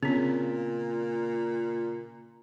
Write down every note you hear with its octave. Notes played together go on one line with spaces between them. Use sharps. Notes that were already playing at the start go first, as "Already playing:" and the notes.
A#2 C#3 B3 C4